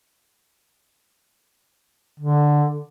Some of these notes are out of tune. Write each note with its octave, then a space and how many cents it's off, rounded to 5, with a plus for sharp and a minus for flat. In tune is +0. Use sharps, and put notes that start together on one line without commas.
D3 +5